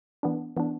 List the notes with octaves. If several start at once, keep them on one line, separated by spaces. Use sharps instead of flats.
E3 B3 D4
E3 B3 D4